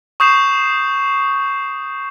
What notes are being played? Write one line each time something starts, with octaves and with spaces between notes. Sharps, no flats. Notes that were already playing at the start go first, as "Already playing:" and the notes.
C#6 D#6 G6 C7 E7